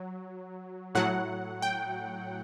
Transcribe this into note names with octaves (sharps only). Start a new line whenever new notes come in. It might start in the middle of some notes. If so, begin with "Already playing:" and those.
Already playing: F#3
A2 F#3 F#5
G5